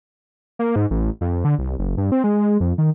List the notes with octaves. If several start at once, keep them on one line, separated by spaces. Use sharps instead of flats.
A#3
G#2
A1
F2
D3
C2
F#1
G2
C4
G#3
F2
D#3